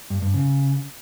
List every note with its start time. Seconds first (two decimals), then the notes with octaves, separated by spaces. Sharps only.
0.10 G2
0.22 G2
0.34 C#3